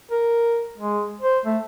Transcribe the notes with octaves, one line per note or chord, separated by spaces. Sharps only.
A#4
G#3
C5
A3